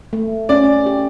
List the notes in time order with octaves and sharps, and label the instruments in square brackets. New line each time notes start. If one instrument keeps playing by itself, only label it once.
[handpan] A3
[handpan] C#4 [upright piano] D5
[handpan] G4